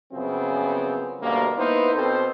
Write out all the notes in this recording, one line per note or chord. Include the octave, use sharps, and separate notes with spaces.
F#2 C#3 F3 B3 C4 G#4
D2 B2 G3 A#3
A#3 B3 D#4 E4 B4 C5
B2 C4 A4 C5